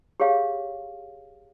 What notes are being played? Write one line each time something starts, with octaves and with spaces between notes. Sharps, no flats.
G4 G#4 C#5 F5